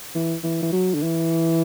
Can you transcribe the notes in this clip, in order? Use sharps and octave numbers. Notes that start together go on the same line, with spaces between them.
E3
E3
E3
F#3
D3
E3